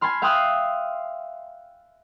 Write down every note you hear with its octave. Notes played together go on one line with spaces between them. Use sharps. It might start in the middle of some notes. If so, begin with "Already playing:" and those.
G#5 A5 B5 C6 F6
E5 F5 G5 C6 D#6 F#6